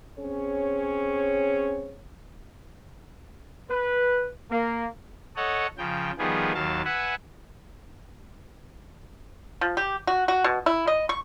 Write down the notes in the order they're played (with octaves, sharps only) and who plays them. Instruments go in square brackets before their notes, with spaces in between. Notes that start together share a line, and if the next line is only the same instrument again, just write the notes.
[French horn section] C4 C#4 G#4 C#5
[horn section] B4
A#3
[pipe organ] A4 C#5 D#5 F#5
C#3 F3 G5
D#3 F3 G3 B3 F4 G#4
D#2 F#3 F5 A5
B4 E5 F#5 G#5
[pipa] F3
G4
F#4
F#4
B2
E4
D#5
C#6